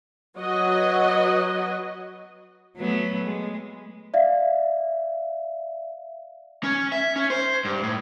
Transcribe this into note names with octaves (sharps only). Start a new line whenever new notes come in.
F#3 F#4 B4 D#5
F#3 A3 B3
G#3
D5 E5 F5
C#4
E5
C#4
C5
G2
A2